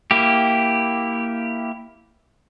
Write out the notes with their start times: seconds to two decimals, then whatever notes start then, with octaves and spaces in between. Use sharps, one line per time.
0.11 A#3 E4 G4